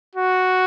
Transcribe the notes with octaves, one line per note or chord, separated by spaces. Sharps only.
F#4